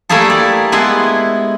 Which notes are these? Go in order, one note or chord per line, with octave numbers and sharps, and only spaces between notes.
G3 A3 A#3 E4 G#4 A4
D5
G#3 B3 E4 G#4